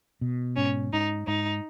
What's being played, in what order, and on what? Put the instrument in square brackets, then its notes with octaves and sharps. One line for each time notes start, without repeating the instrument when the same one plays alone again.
[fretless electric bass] B2
[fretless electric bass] G#2 [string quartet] C#4
[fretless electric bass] G#2 [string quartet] D#4
[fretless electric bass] G#2 [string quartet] D#4